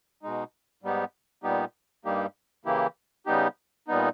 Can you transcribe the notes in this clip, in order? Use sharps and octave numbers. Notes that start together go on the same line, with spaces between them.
B2 G#3 D#4
G#2 G3 B3 D#4 G4
A#2 G3 B3 D#4 G4
G2 G3 A#3 D#4 G4
C#3 E3 A#3 E4 G4
C#3 G3 B3 D#4 G4
A#2 G3 B3 D#4